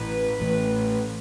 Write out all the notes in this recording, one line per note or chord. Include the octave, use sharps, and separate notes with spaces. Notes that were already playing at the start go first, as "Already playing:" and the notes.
Already playing: A1 A2 E3 B4
A1 A2 E3